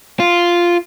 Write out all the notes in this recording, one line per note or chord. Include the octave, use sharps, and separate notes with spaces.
F4